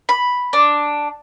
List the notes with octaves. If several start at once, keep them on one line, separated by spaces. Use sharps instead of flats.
B5
D4